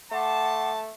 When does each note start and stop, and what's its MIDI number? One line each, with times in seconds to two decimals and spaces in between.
0.12 0.92 57
0.12 0.71 78
0.12 0.80 81
0.12 0.71 84
0.12 0.71 86